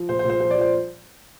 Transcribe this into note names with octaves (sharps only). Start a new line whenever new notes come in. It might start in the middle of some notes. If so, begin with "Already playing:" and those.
Already playing: F3
A#2 C5
C5
A#2
C5
F3 C5
F3 D5
C5